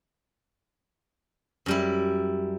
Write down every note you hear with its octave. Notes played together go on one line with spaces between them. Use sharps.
F#2 G3 E4